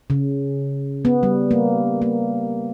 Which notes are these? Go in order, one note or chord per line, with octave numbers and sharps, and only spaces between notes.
C#3
B3
G3
A#3
A#3